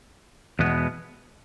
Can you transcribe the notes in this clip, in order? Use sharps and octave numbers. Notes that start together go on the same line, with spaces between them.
E2 B2 G#3 B3